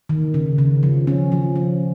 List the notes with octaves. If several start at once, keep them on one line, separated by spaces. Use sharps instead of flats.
D#3
C#3
C#3
F3
C#4
F3
C#4